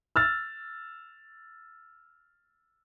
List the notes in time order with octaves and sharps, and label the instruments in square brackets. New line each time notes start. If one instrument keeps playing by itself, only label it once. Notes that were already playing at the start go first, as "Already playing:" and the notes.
[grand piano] E6 F6 A6